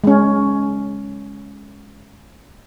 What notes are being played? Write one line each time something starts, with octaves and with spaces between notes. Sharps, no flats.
G#3 C#4